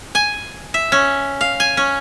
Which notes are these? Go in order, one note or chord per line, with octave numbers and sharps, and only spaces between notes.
G#5
E5
C#4
F5
G#5
C#4